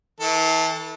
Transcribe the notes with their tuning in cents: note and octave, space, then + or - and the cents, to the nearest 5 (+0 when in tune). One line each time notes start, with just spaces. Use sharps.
E3 -35 A4 +0